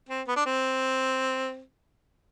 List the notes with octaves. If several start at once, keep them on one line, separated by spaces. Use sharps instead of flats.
C4
B3
D4
C4